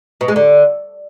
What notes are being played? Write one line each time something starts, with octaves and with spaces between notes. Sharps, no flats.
B2
G#3
D3